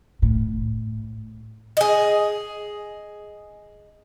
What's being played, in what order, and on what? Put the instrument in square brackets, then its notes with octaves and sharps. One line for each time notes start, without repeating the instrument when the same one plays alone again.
[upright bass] A2
[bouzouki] G#4 D#5